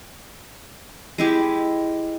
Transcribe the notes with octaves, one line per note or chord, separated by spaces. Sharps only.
G#3 E4 G4